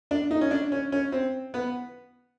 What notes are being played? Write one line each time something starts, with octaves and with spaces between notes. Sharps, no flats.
D4
D#4
C#4
D4
C#4
C#4
C4
B3